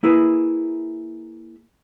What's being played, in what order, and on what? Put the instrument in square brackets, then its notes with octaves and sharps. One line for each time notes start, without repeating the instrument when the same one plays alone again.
[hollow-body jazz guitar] A#3 E4 G#4 B4